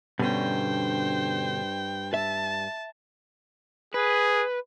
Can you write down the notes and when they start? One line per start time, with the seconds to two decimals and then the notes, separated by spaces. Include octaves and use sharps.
0.19 G2 B2 D3 C#4 C5 G5
2.14 E5 A5
3.94 G#4 B4